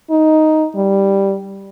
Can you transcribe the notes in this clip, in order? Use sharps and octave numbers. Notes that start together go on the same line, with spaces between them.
D#4
G3